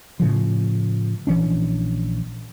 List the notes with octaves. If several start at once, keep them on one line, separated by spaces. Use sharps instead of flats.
A2 C#3 F3
A#1 E3 C#4 D4